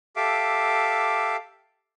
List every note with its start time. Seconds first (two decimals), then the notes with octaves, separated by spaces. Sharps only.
0.16 G4 A4 E5 F5 D6